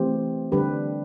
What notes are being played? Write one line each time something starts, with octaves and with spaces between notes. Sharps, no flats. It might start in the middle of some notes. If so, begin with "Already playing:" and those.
Already playing: E3 A3 C4 G4 C5
D3 G3 D4 G4 B4